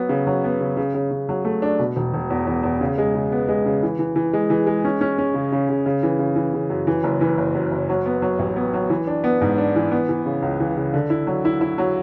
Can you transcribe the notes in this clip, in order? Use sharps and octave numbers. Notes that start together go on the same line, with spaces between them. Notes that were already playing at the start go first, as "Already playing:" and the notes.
Already playing: F#3 B3
C#3
F#3
B3
C#3
C#3
C#3
C#3
F#3
A3
D4
B2
E1
E1
E2
E2
E2
C#3
G#3
C#3
B3
G#3
C#3
E3
E3
E3
G#3
E3
G#3
C#4
C#4
C#4
C#3
C#3
C#3
C#3
E3
C#3
E3
C#3
F#2
E3
F#1
E3
F#1
F#2
F#1
F#3
B3
F#3
A1
B3
F#3
E3
D4
B3
G#2
D4
E3
B3
E3
C#3
C#2
E3
C#3
D3
E4
F#3
E4
E4
F#3